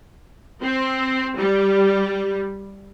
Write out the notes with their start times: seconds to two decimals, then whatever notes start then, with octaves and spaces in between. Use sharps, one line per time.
0.62 C4
1.36 G3